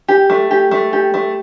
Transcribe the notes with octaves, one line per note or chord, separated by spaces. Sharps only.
G4
A3
G4
A3
G4
A3